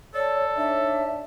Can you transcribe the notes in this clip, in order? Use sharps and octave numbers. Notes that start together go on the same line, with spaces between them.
A4 C#5 D5 A5
D4 D#4 C#5 E5